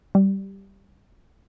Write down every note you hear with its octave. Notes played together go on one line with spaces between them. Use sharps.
G3